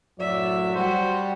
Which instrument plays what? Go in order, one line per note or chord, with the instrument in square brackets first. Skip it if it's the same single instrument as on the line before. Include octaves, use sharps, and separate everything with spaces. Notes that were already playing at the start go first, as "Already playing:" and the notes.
[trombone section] F#2 A2 F#3 [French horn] D5 [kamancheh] E5
[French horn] G3 [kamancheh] F#4 [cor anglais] C5